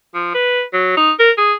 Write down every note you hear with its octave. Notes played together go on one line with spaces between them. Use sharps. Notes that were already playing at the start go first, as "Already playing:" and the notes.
F3
B4
F#3
D#4
A#4
G#4